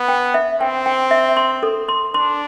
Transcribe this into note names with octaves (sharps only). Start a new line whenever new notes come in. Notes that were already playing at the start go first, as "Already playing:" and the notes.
Already playing: B3
G5
E5
C4 G5
G5
E5
C6
A4
C6
D4 C6